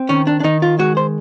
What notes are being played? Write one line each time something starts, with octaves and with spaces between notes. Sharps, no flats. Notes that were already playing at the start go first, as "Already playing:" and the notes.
Already playing: C4
D#3 C#4
D4
D4
D#3 D#4
F4
G#3 F#4
C5